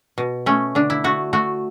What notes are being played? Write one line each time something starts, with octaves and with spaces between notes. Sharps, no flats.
B2
A3 C#4
D3 D4
E4
A3 F#4
A3 F#4